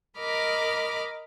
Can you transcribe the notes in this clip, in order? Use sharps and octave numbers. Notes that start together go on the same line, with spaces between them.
A#4 D#5 B5 D6 F6